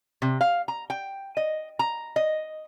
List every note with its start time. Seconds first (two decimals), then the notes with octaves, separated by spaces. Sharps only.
0.22 C3
0.41 F5
0.68 A#5
0.90 G5
1.37 D#5
1.79 A#5
2.16 D#5